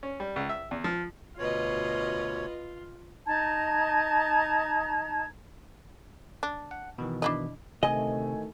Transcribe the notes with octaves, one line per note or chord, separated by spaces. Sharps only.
C#4
G3
C#2
E5
E2
F3
D2 B2 F4 B4 C#5 D#5
D#4 A5 A#5 G#6
D4
F#5
B2 D#3 E3
D4 E4 D#5
D2 C3 D#3 A3 D#5 G#5